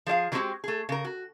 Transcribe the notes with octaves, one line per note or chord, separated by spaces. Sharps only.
F3 G#4 D5 F5
D#3 F#3 G#3 C4 F#4 G4
A3 G#4
C#3 A#4
F#4